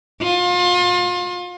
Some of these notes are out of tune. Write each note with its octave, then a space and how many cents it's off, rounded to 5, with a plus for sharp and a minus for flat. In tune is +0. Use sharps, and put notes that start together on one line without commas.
F4 +35